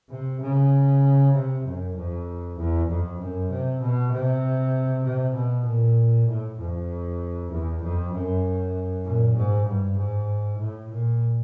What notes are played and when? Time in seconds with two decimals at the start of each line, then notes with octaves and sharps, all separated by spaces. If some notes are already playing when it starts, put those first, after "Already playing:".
0.10 C3
0.41 C#3
1.34 C3
1.65 F#2
1.95 F2
2.58 E2
2.88 F2
3.19 F#2
3.50 C3
3.81 B2
4.12 C3
5.04 C3
5.35 B2
5.66 A#2
6.28 A2
6.58 F2
7.51 E2
7.82 F2
8.13 F#2
9.05 A#2
9.36 G#2
9.67 G2
9.97 G#2
10.59 A2
10.90 A#2